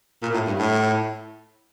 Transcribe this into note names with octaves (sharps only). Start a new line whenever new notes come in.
A#2
A2
G2
A2